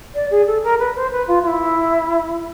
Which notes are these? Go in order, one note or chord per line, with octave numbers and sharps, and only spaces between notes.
D5
G#4
A4
A#4
B4
C5
B4
F4
F4
E4